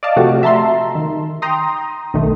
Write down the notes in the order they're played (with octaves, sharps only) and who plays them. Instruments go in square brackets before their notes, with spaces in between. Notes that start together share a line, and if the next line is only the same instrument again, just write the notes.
[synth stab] D5 D#5 F5 A5
C3 F3 A3 F#4 G4
E5 A5 A#5 C6
D#3
G5 A#5 C6 D#6
B1 D#3 A3